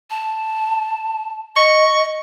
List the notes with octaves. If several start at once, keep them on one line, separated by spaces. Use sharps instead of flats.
A5
D#5 C#6